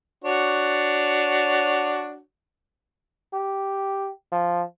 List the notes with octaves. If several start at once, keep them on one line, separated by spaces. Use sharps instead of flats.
D4 F#4 C#5
G4
F3